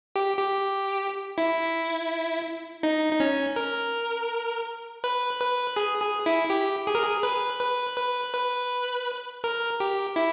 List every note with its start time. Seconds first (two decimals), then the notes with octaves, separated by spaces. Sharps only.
0.16 G4
0.39 G4
1.38 E4
2.83 D#4
3.13 D#4
3.20 C#4
3.56 A#4
5.04 B4
5.41 B4
5.77 G#4
6.01 G#4
6.26 E4
6.50 G4
6.87 G#4
6.95 A#4
7.03 G#4
7.23 B4
7.61 B4
7.96 B4
8.34 B4
9.44 A#4
9.80 G4
10.16 E4